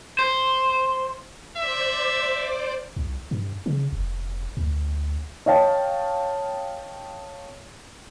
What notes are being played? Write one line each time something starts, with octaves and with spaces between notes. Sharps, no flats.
C5
C5 D5 E5 D6
C2
G2
C#3
F1
D2
C#5 D#5 F5 G5 A5